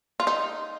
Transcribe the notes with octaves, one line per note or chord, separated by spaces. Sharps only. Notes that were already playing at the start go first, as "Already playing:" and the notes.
F4
D#4